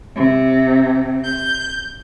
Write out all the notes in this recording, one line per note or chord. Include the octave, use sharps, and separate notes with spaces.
C3
G6